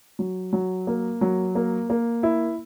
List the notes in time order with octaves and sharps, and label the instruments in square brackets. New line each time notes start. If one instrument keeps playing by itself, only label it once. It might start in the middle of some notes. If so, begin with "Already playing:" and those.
[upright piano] F#3
F#3
A#3
F#3
A#3
A#3
E4